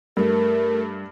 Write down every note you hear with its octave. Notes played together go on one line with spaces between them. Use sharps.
G2 A3 A#4